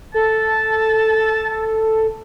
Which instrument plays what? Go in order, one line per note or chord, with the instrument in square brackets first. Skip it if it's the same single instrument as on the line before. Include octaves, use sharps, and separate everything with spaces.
[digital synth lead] A4 [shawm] A5